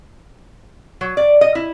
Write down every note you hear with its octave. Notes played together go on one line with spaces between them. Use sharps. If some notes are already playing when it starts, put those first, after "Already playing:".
F#3
D5
D#5
E4